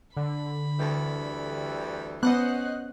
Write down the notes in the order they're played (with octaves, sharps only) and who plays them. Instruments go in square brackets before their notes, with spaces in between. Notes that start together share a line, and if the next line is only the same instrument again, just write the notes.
[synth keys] D3 [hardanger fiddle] B5
[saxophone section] D2 E3 G3
[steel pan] B3 [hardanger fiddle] C#4 C5 [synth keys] D#5 F#5 F#6